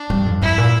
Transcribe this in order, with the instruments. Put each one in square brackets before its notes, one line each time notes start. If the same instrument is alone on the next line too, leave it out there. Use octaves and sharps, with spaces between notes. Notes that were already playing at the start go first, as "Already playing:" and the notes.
Already playing: [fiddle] D4
[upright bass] G2
F2
[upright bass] G2 [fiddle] E4
[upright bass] A#2